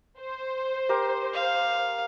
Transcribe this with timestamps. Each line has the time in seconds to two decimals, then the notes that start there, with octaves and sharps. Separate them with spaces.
0.20 C5
0.89 G4 A#4
1.33 F5